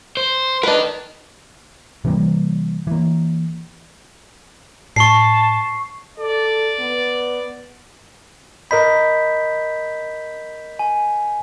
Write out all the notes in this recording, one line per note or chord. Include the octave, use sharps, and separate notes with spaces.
C5
D4 A#4 B4 D#5
C3 E3 G3 A#3
E3 A#3
A2 A5 C#6 C7
A4 D5
B3
A#4 D#5 B5 G6 B6
G#5